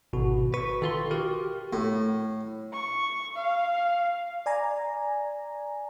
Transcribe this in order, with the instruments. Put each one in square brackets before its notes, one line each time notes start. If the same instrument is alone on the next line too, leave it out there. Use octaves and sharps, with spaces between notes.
[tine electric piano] G#1 B2 F#4
[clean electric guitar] B4 [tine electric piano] C#6
[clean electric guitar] D#3 F4 C6 [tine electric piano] A4
[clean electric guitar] F#4 A#4 [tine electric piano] G4
[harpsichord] A2
[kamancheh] C#6
F5
[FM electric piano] D5 G#5 A#5